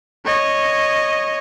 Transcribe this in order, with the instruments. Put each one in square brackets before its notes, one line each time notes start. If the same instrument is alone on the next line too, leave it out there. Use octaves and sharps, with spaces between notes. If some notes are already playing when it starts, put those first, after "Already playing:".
[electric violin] C#5 D#5